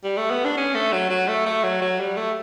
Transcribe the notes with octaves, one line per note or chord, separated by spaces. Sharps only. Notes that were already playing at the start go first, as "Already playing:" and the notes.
G3
A3
B3
D4
C#4
A3
F#3
F#3
A3
A3
F#3
F#3
G3
A3